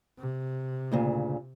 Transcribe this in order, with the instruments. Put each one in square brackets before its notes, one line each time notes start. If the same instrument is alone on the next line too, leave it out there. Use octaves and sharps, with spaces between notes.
[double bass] C3
[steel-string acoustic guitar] D2 A#2 C#3